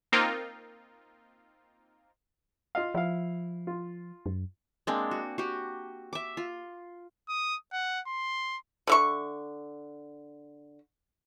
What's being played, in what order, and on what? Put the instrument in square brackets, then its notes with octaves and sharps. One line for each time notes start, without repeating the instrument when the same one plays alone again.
[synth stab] A#3 C4 D#4 F4 A#4
[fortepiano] F4 D#5 F5
[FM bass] F3 [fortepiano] E4 F5
[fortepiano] F4
[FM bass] F#2
[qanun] G#3 A#3 C4 D4
F#4
F#4 G4
E5 D6
F4
[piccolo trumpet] D#6
F#5
C6
[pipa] D3 E5 C#6